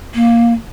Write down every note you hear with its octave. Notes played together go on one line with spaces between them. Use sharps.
A#3